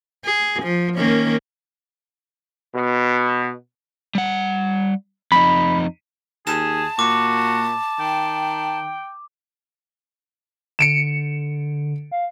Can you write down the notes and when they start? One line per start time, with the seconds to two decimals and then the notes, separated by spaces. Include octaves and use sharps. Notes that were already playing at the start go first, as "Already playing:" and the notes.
0.25 G#4
0.63 F3
0.96 D#3 A#3 C#4
2.74 B2
4.15 G3 F#5
5.32 F2 D#4 B5
6.47 D#2 G#4 A5 E7
6.99 A#2 F#4 D6
8.00 D#3 G5
10.79 D3 C#7 D7 E7
12.11 F5